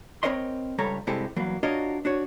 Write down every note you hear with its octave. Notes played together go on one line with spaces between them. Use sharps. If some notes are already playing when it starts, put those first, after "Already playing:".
C4 D#4 A#4 C#5 D#5 C6
C#2 G2 G3 A4 C#5 A#5
G2 C3 G#3 E4 G4 A4
E2 G2 F#3 A#3
D4 F4 F#4 A#4 C#5 D#5
D4 F#4 C#5